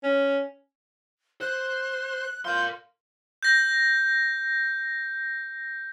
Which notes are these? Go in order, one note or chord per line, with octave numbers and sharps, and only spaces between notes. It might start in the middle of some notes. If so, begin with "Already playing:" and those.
C#4
C5 F#6
F4 A#4 C6 G6
G6 A#6